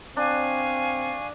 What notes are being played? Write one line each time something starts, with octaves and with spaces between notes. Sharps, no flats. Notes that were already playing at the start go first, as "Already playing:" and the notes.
C4 D4 F5 G#5 C#6